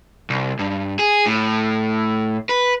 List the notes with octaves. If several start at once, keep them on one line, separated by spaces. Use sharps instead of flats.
C2
G2
G#4
A2
B4